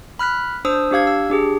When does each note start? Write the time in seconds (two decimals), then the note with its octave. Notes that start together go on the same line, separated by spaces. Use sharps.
0.19 B5 F6 F#6 B6
0.65 D4 C5 D#6 E6
0.91 D4 G4 F5 G#6
1.07 E6
1.30 D4 G4 G#4